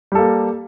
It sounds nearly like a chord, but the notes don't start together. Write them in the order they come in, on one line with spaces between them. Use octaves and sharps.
G3 A4 A#3